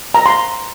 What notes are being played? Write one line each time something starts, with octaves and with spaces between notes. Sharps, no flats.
A#5
C6